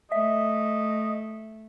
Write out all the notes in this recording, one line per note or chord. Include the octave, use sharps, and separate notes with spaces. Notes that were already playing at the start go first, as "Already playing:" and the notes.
A3 D#5 E5